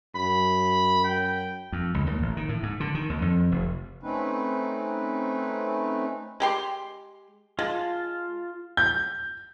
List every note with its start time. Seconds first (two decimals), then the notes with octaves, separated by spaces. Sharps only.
0.15 F#2 B5
1.05 G5
1.72 F2
1.94 C#2
2.07 D#2
2.22 A1
2.37 D#3
2.49 A2
2.63 G#2
2.80 D3
2.95 D#3
3.10 D#2
3.22 F2
3.52 F1
4.03 A3 C4 C#4 D#4 B4
6.40 G#3 G4 C6
7.59 G#3 F4 A5
8.77 G6